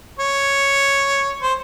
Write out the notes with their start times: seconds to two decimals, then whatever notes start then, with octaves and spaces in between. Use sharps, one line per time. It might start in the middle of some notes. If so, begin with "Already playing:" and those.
0.19 C#5
1.42 C5